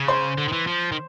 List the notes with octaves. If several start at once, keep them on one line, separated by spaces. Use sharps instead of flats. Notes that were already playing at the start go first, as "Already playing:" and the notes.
Already playing: C#3
C5 C6
D3
D#3
E3
F3
D#3